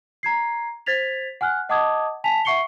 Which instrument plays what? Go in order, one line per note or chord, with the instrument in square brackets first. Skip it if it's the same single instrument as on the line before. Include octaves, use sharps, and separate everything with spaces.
[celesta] A#5 G#6 C7
C5 G#6 A6 B6 F7
F#5 G#5 F6 F#6
D#5 F#5 A5 D6 D#6 G#6
G#5 A5 B6 F7
E5 F#5 C#6 C7 C#7 G7